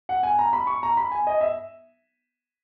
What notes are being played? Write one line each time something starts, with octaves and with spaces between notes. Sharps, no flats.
F#5
G#5
A#5
B5
C#6
A#5
B5
G#5
D#5
E5